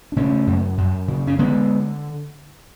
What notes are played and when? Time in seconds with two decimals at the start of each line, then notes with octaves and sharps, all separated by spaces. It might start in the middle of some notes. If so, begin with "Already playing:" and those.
0.12 D4
0.16 C#3 A3 C#4
0.47 F#2
0.78 F#2
1.08 C#3
1.27 C#4
1.38 D3 G#3 B3